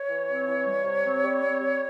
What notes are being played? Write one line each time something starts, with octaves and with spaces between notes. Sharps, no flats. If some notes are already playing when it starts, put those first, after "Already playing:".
Already playing: C#5
E3
C4
E3
G3
C3
C4
G3
C4
G3